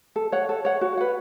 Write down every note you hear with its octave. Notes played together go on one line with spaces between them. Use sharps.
A4
C#5 F#5
A4
C#5 F#5
F#4
B4 F#5